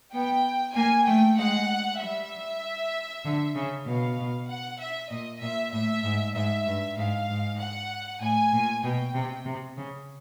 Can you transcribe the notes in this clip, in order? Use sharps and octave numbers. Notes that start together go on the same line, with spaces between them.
B3 G5
A#3 G#5
A3 G5
G#3 F#5
G3 E5
D3
C#3
B2 F5
F#5
E5
A#2 D#5
A#2 E5
A2 E5
G#2
G#2 E5
G2
G#2 F5
G#2
F#5
A2 G#5
A#2
B2 G5
C3
C3
C#3